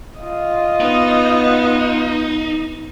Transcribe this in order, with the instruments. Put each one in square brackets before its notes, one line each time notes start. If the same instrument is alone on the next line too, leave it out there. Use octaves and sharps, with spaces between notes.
[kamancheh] F4 D#5
[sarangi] B3 [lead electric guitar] D#4